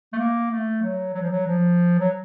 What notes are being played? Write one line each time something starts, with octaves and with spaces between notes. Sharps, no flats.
A3
A#3
A3
F#3
F#3
F3
F#3
F3
F#3